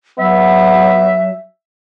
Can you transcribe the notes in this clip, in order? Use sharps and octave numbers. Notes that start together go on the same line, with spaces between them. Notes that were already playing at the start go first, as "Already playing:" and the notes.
F#3 B3 E5